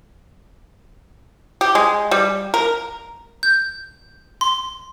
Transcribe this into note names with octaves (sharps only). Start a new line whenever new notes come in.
G4
G#3
G3
A#4
G6
C6